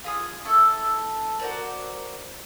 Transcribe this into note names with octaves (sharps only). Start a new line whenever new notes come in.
F4 G#4 D#6
E4 A4 C#6
F#4 A#4 C5 D5